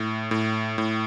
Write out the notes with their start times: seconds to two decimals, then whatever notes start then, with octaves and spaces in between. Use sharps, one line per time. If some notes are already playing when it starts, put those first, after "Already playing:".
Already playing: A2
0.31 A2
0.78 A2